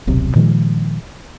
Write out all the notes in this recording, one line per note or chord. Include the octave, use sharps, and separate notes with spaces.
D#1 B1 C3
A#2 D#3 F3 G#3